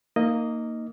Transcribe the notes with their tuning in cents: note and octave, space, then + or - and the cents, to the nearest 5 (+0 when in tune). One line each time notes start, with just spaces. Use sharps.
A#3 -10 D#4 +0 D#5 +0